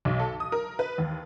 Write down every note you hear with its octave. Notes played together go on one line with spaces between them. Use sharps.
B1
A4
D#6
A#4
B4
D#2